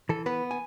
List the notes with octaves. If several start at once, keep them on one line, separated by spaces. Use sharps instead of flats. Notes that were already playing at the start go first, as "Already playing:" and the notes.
E3 A4
B3 B4
G#5